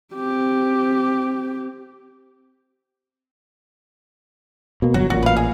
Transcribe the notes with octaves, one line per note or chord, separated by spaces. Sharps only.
C4 G4
B2 A#3
G1 F#3 F#4
A1 A#2 F#4
B4 F5
G#4